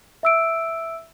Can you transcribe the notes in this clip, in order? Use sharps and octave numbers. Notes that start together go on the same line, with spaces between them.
E5 E6 D7